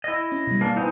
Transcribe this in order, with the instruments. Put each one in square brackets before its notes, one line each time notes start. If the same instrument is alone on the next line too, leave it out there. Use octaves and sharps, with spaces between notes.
[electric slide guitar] E4 D#5
[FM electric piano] C#4
B2 G3
[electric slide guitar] A#3 D4
[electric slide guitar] B3 C4 D#4 [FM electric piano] E4 D#5 G#5